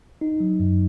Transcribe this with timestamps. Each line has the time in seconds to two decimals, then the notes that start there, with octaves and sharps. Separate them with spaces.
0.21 D#4
0.40 F#3
0.60 F#2